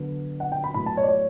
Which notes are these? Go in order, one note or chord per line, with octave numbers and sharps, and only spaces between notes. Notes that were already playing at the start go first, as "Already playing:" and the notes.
Already playing: D3 F#3 B3
F#5
G5
B5
A2 F#3 B3 B5
A5
C#5
D5
C#5